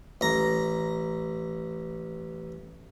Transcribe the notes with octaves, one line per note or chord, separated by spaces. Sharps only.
A1 A#5